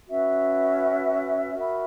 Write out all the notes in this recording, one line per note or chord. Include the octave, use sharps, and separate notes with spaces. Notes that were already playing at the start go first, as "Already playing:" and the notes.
C#4 F#4 B4 E5
F#4 A#4 E5 B5